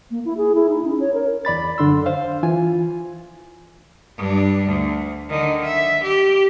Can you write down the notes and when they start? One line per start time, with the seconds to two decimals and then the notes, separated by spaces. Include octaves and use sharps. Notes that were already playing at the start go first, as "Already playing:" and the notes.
0.11 A#3
0.25 E4
0.37 G#4
0.55 E4
0.69 D#4
0.85 C#4
1.00 C#5
1.14 A#4
1.45 E2 D5 B5 A6
1.78 F#2 D3 D4 C6 E6
2.06 C5 F5
2.43 E3 F4 G#5
4.17 G2 D4
4.67 D2
5.29 D3 D#3
5.65 E5
6.04 G4